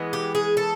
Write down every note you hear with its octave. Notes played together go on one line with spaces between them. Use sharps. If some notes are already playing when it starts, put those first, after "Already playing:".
Already playing: E3 G#3 B3
G4
G#4
A4